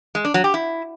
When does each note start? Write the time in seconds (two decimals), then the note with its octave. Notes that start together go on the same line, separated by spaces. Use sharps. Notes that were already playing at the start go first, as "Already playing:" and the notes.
0.15 G#3
0.25 D4
0.34 F#3
0.44 G4
0.54 E4